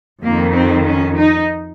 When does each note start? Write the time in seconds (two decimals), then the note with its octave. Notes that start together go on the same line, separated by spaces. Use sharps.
0.22 F2 D#3 A#3
0.54 C4
0.85 C#4
1.17 D#4